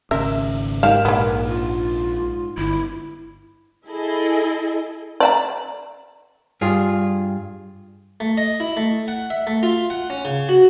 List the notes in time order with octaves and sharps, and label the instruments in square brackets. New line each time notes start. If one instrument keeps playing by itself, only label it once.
[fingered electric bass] G#1 C#3 C#4 [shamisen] A#4 E5
[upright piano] G#2 E7 [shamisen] G4 F5 [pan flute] A#4
[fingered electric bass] A#1 [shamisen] A#3 B3
[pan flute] F4
[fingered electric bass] G1 [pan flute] E4
[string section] E4 G#4 A4 D#5
[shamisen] D5 E5 A#5
[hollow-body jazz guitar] G2 F4 G#4
[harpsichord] A3
D#5
E4
A3
F#5
E5
A3
F4
F#5
C#4
C#3
F#4